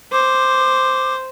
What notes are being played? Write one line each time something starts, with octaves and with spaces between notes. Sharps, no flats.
C5 D6